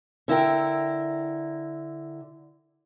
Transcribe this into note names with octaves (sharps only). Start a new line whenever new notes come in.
D3 E4 A#4 G5